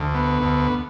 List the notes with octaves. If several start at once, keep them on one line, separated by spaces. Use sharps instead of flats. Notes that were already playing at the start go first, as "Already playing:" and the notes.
Already playing: D2
B3
D2